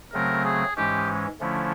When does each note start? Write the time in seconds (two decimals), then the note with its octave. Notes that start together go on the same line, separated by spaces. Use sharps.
0.13 C#3 F#3 A3 C4 A#4
0.45 G#4
0.76 G#2 E3 G#3 C#4 G4
1.40 D3 F3 A3 C#4 E4